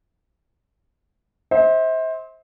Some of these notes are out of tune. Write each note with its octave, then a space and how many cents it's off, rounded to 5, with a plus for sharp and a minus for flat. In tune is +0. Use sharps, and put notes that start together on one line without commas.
C5 +10 E5 -40